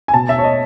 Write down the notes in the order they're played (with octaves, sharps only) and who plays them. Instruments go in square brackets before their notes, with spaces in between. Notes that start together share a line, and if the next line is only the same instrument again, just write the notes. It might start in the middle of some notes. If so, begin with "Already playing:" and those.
[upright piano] G#5
B2 A5
E5
C#5
D#5